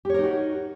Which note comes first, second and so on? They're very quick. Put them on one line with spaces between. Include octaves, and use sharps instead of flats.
G4 C#5 A#4 D#4 F#4